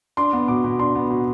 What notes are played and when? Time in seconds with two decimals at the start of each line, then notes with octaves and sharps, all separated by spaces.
0.17 D4 C6
0.33 B3
0.48 B2 D6
0.64 B2
0.79 D4 C6
0.95 B3
1.10 B2